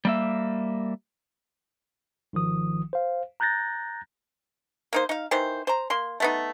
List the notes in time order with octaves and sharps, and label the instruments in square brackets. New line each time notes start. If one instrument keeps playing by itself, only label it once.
[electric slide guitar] G3 A#3 E5
[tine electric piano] G#1 D#3 F3 D#6
C5 F5
A#5 F#6 G6 A6 A#6
[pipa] A#3 D#4 C5
D#4 F5
D#3 E3 C5
C5 A#5
A#3 C6
A3 B3 D#4